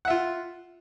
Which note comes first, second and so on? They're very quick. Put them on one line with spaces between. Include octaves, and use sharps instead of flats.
F#5 E5 F4